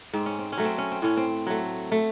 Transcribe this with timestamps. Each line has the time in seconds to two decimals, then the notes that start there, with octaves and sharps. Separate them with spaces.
0.13 G#2 C4
0.26 C#4
0.39 C4
0.52 C#4
0.57 F#3 A3
0.65 C4
0.78 C#4
0.92 C4
1.02 A2 C#4
1.17 C4
1.47 F#3 A3
1.92 A3